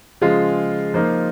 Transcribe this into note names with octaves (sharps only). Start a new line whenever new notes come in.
C#3 F3 G#3 F4
F3 A#3 D#4